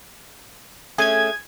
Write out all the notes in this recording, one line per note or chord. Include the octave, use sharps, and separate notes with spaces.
A3 C#4 G#4 G#5 G#6